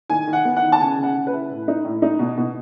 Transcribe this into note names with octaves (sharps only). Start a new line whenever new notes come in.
D#3 G#5
D#3
F#5
B3
F#5
D#3
A5
C#3 G#5
C#3
F#5
C#3
B4
E4
A2
D#4
A2
D#4
B2
B2